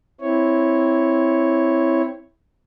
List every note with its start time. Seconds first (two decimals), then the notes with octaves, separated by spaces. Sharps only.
0.21 C4 E4 C#5